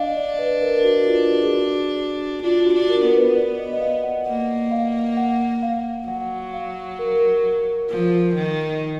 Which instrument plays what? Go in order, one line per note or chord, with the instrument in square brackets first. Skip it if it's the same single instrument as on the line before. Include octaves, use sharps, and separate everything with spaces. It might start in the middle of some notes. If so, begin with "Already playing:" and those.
Already playing: [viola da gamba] D4 [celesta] D#5 F5
[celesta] D5
B4
A#4
F#4
F4
F#4
G#4
F#4
[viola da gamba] D4 [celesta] F4
[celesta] F#4
[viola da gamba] D4
[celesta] A#4
[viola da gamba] B3
[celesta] B4
D5
D#5
D#5
F5
F#5
[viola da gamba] A#3 [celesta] F#5
[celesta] F5
F#5
F5
[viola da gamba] F#3 [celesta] F#5
[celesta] F5
A#4
[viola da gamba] F3
D#3